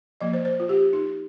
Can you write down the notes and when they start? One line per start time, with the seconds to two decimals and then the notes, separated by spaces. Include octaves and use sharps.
0.21 F3 A#3 D#5
0.33 C5
0.45 C5
0.60 F4
0.69 G4
0.93 D#4